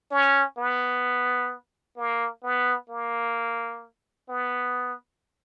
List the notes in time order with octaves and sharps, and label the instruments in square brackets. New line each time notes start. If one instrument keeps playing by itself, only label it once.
[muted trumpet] C#4
B3
A#3
B3
A#3
B3